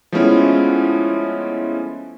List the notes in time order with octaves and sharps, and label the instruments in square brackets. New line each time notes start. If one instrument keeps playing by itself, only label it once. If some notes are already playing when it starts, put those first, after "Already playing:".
[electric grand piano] F3 G#3 A3 B3 C#4 E4